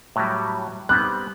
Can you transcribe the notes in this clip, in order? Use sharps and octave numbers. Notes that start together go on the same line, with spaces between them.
A2 F#3 G3
G3 B3 C4 F#6